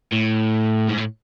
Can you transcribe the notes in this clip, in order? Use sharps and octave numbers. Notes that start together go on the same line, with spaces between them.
A2
G#2
A2